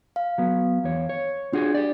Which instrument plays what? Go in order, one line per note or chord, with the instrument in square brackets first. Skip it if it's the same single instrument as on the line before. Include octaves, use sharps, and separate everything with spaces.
[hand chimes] F5
[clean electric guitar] F#3 B3
E2 C#5
C#5
[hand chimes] D4 [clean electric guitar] F4 F#4 G#4
[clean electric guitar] G4 D5